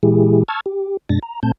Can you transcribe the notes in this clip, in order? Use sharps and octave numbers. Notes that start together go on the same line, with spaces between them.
A#2 E3 G#3 E4 G4 G#4
A5 C#6 E6 F6 G#6 A6
G4
F#2 B2 G#3 D4 A6 A#6
A#5
A#2 A3 C4 A5 G6